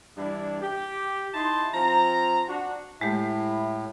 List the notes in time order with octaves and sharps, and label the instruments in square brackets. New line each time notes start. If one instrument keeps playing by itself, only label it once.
[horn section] G2 E3 G3 D4 E4
G4
D#4 E4 A5 C6
F3 C4 A#5
D4 F#4
[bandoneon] A2 [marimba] G#3 A3 G4 [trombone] E4